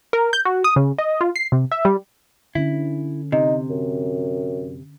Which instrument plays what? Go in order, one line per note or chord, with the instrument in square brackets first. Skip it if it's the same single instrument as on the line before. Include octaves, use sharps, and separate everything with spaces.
[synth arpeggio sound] A#4
G6
F#4
D#6
C#3
D#5
F4
C7
C3
E5
G3
[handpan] D3 C#4 [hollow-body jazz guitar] E4
[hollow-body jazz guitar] C3 [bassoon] D#4
[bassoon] F#2